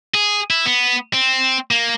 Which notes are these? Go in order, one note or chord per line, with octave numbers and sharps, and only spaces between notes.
G#4
E4
B3
C4
A#3